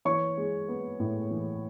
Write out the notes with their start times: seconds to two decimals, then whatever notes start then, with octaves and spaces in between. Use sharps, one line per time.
0.05 E3 C#5 C#6
0.37 G#3
0.68 B3
1.00 A2
1.31 E3